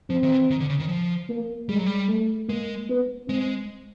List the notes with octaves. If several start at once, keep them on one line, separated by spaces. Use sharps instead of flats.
F3 C4
D#3
E3
D#3
D3
C#3
D#3
F3
A#3
G3 G#3
F#3
G3
A3
G#3 A#3
B3
G#3 C4